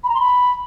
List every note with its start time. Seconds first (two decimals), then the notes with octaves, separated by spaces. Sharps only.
0.04 B5
0.09 A#5
0.15 C6
0.20 B5